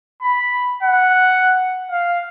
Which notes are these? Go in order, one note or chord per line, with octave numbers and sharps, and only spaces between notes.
B5
F#5
F5